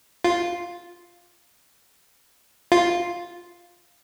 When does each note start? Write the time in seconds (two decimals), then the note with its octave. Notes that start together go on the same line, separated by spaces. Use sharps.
0.24 F4
2.72 F4